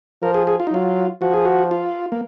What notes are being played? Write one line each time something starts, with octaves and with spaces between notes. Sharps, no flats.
F3 A#4
G#4
G#4
F4
D#4
F#3 F4
F3 F#4
G#4
F#4
F4
A#3